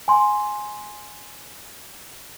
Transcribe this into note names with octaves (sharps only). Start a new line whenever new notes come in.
G#5 C6